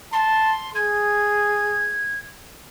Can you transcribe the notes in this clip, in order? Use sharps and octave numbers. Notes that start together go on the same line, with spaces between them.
A5 C6
G#4 G#6